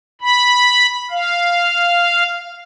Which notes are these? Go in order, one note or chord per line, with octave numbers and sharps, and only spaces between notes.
B5
F5